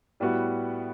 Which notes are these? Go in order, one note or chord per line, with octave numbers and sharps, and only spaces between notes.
A2 G3 B3 F#4